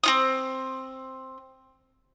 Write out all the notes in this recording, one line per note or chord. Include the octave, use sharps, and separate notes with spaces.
C4 F4 D#6